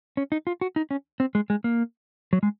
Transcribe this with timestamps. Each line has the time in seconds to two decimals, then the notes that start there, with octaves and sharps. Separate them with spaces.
0.17 C#4
0.32 D#4
0.47 F4
0.61 F#4
0.76 D#4
0.91 C#4
1.20 C4
1.35 G#3
1.50 G#3
1.64 A#3
2.33 F#3
2.43 G#3